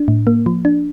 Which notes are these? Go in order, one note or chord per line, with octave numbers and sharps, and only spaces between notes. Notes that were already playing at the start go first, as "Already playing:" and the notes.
Already playing: D4
A2
A#3
F3
D4